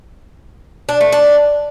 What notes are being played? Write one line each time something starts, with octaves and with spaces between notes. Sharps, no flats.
D4
A3
D4